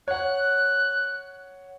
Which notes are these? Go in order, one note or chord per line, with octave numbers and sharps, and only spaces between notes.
C#5 F#5 F#6